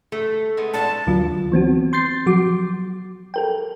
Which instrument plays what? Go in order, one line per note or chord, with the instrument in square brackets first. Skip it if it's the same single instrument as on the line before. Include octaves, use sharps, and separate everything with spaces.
[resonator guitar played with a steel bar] A3 [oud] A4
[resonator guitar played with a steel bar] G#3 A3 B3
[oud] D4 E4 F4 [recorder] A5
[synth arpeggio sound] D2 D3 F#3 F4
E3 B3 C4 F#4
C6 G6 A6 C7
F3 F#3 F#4 D6
A4 A#4 G5